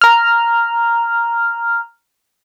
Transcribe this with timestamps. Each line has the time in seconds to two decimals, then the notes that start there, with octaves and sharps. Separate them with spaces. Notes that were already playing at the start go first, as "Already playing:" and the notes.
0.01 A#5 F6